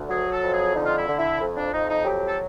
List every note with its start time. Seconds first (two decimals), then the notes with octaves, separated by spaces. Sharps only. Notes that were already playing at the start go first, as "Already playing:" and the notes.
Already playing: D2
0.10 F#3 G#4
0.32 A4
0.42 F2
0.54 G#4
0.75 D3 D#4
0.86 F4
0.97 E4
1.08 D3
1.19 E4
1.40 F2
1.57 D4
1.72 F2 D#4
1.90 D#4
2.05 F#3 G4
2.28 A4